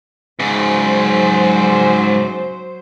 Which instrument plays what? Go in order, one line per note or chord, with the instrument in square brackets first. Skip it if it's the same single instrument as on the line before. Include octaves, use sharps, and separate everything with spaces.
[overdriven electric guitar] G#2 C#3 [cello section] F#3 C5